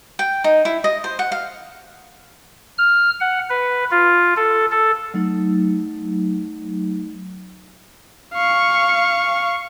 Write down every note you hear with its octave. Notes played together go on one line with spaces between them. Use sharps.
G5
D#4
E4
D#5
C5
F#5
F5
F6
F#5
B4
F4
A4
A4
F#3 A3 D#4
F5 C#6